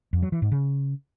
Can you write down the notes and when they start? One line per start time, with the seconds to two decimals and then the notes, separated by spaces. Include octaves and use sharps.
0.13 F2
0.23 F#3
0.32 E3
0.42 G#2
0.52 C#3